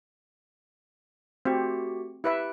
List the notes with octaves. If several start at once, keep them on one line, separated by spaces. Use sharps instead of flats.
A3 C4 F#4 G4
E4 G4 B4 E5 F#6 D7